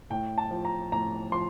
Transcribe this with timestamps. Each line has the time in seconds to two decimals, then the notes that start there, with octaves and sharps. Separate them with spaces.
0.10 A2 G5
0.38 A5
0.51 F3
0.65 A#5
0.92 A2 A#5
1.32 F3 C6